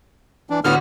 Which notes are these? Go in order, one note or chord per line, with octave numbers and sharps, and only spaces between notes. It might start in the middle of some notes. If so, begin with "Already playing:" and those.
E3 D4
A2 D3 G3 B3 F#4 F6